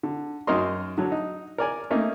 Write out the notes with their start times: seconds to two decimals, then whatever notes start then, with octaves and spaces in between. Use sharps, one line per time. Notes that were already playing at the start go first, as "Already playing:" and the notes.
0.03 D3
0.47 F#2 D#4 A#4 D#5 C6
0.98 D3 F#3
1.12 D#4
1.58 A#4 D5 G#5
1.91 A3 A#3 C#4 D#4